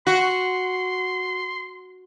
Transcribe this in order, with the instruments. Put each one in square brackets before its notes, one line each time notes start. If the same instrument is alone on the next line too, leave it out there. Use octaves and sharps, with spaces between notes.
[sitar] F#4 [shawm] C6